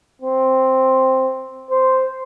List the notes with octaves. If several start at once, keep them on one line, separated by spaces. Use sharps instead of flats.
C4
C5